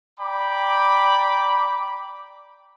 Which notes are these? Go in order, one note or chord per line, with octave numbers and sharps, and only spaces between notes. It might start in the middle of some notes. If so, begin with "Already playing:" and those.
D5 G5 A#5 B5 D6